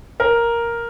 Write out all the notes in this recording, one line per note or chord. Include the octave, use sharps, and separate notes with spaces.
A#4